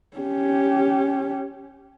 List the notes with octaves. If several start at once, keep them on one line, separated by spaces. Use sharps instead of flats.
C#4 G4